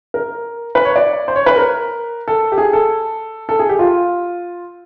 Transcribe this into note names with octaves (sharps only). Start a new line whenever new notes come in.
A#4
B4
C#5
D5
C5
C#5
B4
A#4
A4
G4
G#4
A4
A4
G#4
G4
F4